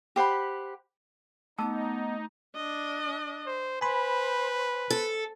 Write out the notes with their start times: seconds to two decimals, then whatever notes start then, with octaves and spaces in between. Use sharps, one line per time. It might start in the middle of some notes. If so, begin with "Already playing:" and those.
0.16 G4 C5 F#5 B5
1.59 A3 B3 D#4 A5 E6
2.55 D4 D#5
3.46 C5
3.81 B4 C5 G#5 B5 C6
4.90 A4